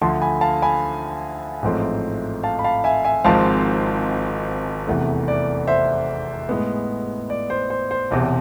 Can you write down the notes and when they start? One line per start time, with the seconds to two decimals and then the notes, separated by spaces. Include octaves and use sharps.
0.01 D2 D3 F3 A5 C6
0.21 G#5 B5
0.41 F5 A5
0.62 G#5 B5
1.63 A1 G#2 F3 A3 C4
2.43 F5 A5
2.59 B5
2.64 F5 A5
2.84 E5 G#5
3.05 E5 G#5
3.24 G#1 G#2 F3 G#3 C4 F5 A5
4.87 F1 E2 C3 E3 A3
5.28 D5
5.67 C5 E5
6.49 A2 G#3 B3
7.30 D5
7.50 C5
7.70 C5
7.91 C5
8.11 E1 E2 C3